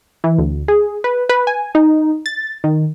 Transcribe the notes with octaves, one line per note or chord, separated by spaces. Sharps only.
E3
D2
G#4
B4
B4
G#5
D#4
A6
D#3